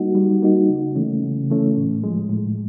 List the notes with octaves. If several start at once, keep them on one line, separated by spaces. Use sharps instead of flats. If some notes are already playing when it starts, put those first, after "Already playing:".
Already playing: G3 A#3 D#4 F#4
G3
A#3 D#4 F#4
C#3
E3 A3 C#4
C#3
E3 A3 C#4
A2
F3 G#3
A2